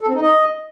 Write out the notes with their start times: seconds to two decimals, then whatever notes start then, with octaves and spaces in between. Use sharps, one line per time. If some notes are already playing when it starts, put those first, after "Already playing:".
0.01 A4
0.08 C4
0.15 D#4
0.22 D#5